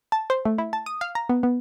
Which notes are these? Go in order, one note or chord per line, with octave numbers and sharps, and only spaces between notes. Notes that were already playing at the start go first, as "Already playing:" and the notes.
A5
C5
A3
E4
A5
D#6
F5
A#5
B3
B3